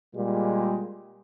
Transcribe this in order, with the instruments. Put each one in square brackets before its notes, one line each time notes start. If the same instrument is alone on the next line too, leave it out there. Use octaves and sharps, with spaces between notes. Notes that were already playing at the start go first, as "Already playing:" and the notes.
[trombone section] A#2 G3 G#3